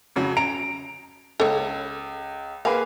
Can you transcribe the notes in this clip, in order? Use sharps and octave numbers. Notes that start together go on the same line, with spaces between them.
F2 C#3 F#3
A#5 D7
C#2 A4 C#5
A#3 G#4 B4 F5